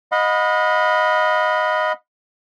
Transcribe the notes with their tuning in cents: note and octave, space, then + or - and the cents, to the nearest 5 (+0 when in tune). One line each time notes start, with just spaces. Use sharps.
D#5 +0 F#5 -45 B5 +0